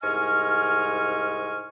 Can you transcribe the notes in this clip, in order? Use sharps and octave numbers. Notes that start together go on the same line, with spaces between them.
C2 G#2 D#5 G#5 C#6 F6